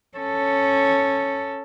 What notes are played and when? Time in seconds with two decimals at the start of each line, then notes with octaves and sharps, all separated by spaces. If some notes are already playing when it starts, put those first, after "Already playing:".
0.18 C#4 A4